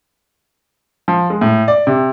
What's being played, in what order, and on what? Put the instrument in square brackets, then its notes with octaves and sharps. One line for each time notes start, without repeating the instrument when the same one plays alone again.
[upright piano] F3
G#3
A2
D5
C3